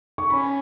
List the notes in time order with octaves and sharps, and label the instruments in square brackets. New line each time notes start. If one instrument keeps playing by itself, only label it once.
[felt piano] C#6
[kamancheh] C#4 [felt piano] B5